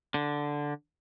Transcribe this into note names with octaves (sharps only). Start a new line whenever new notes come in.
D3